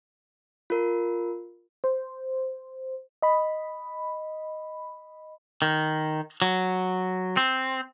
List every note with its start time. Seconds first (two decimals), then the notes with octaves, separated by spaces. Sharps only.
0.70 F4 A#4
1.84 C5
3.22 D#5 B5
5.62 D#3
6.42 F#3
7.37 C4